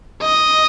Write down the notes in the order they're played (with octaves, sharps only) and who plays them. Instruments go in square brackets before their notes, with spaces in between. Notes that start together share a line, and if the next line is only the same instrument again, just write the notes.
[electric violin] D#5